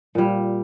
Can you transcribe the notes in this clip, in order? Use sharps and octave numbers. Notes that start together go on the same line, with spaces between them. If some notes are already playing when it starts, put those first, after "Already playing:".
A#2 G3